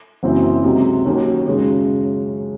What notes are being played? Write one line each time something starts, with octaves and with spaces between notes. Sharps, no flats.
F#1 F#2 E3 C4
C#2 C3 F#3 C4 D#4
D#2 D#3 F#3 C#4
F#2 C#3 G#3 C#4